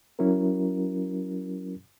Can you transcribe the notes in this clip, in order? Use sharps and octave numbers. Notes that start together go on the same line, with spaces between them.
F#3 C#4 E4 F#4 A#4